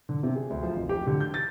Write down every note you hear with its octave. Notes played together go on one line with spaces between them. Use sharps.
D3
C3
G#4
D2
F3
F1
G4
D3
G6
A6